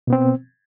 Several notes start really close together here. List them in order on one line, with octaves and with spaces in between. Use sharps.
B2 B3 C4